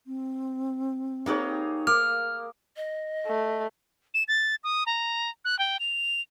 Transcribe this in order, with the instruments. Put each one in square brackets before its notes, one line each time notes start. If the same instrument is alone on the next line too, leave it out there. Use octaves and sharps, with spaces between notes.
[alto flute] C4
[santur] A#3 G#4 C#5 [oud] D#4 G4 B4
[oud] A#3 [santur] D6 [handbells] F6
[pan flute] D#5
[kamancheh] A3
[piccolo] E7
A6
D#6
A#5
F#6
G5
F7